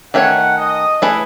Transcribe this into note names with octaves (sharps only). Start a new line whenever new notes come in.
D#3 A3 C#4 F#4 C#5 F#5
D#5
A3 E4 G#4 B4